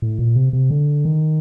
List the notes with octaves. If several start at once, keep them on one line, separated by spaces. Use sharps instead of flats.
A2
A#2
C3
C3
D3
D#3